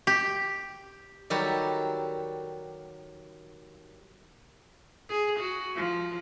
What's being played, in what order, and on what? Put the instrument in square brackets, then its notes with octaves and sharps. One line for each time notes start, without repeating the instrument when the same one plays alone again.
[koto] G4
[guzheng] D#3 F#3 G3 F#4 G4 A4
[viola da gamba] G#4
F#4
F3